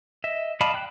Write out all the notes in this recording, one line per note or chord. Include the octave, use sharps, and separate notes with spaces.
D#5 E5
D5 D#5 F5 A5 B5
G5 F#6